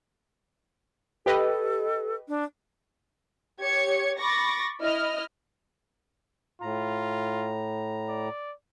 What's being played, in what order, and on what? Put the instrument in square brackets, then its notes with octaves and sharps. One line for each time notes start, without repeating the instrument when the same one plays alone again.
[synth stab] G4 B4 D#5 [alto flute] A4
[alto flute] D4
[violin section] G4 C#5 G#6 C#7
B5 C#6 D6 A6 A#6
E4 D#5 F6
[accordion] A2 A#5 [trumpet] F4
[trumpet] D5